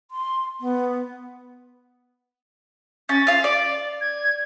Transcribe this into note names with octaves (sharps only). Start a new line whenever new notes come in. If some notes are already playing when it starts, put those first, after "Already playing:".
C6
B3
C#4 A6
F4 F5
D5
G#6